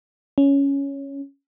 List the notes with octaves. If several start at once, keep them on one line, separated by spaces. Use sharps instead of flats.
C#4